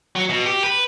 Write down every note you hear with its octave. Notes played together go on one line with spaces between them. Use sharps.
F#3
B2
G4
B4